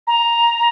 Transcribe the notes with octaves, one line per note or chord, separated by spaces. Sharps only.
A#5